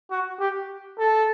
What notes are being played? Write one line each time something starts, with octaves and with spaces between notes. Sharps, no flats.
F#4
G4
A4